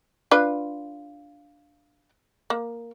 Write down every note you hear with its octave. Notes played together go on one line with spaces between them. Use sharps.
D4 F4 B4
A#3